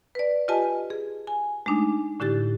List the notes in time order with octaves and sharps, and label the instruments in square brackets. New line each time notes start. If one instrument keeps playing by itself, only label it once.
[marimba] B4 D5
F4 G4 B4 D#5 G#5 A5
G#4
G#5
G#3 A3 D4 D#4
A2 D3 E4 G4 A6